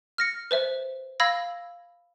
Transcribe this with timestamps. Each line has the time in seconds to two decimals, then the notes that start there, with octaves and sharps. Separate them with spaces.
0.18 F6 A#6 C#7
0.51 B4 C5 E5
1.20 F5 B5 E6 G#6 A#6